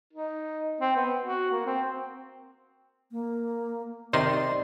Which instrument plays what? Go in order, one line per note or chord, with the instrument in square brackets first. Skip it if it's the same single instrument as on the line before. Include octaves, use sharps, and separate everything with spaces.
[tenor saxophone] D#4
C4
B3
F#4
A#3
C4
[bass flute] A#3
[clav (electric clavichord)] C3 D#3 D#4 [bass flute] D5 [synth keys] C6